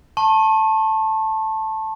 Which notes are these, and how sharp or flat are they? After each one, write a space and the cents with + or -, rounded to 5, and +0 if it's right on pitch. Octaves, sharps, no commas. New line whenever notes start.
A5 +0 C#6 -40